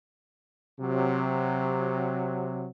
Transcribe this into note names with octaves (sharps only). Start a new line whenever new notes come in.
C3 F#3